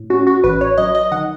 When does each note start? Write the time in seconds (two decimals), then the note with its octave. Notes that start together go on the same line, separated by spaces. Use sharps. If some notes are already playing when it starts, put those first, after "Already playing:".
Already playing: A2
0.10 C#4 F#4
0.27 F#4
0.44 A1 B4
0.61 C#5
0.78 F#3 D#5
0.95 D#5
1.12 D#3 F#5